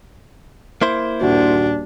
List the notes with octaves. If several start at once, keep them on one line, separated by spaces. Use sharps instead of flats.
A#3 E4 C5
D#1 D4 F#4